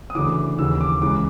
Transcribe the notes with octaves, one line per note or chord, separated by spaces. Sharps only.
D#6
D2 C#3 E3 D6
D#2 C#3 E3 E6
D6
C#2 C#3 E3 D6